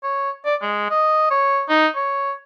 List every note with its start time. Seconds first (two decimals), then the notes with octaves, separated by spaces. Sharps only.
0.03 C#5
0.45 D5
0.62 G#3
0.91 D#5
1.31 C#5
1.69 D#4
1.95 C#5